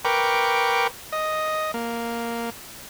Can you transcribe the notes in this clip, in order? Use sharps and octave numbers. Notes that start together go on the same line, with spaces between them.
A#4 B4 G5 C#6 D6
D#5
A#3